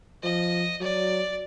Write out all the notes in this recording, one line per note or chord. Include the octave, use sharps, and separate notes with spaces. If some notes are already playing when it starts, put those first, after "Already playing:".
F3 D#5
F#3 D5